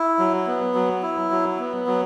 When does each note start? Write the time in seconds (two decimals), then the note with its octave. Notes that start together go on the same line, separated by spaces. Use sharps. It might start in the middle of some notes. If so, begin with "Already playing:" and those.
Already playing: E4
0.19 F#3
0.47 B3
0.74 F#3
1.03 E4
1.31 F#3
1.59 B3
1.87 F#3